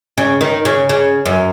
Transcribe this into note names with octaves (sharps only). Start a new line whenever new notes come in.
C#3
D#3
C#3
C#3
F#2